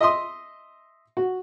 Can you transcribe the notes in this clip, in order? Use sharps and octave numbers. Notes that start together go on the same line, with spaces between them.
D#5 E5 C6 D#6
F#4